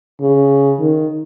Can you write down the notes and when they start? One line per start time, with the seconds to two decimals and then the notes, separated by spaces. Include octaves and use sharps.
0.21 C#3
0.79 D#3